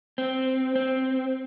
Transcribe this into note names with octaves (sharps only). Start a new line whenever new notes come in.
C4
C4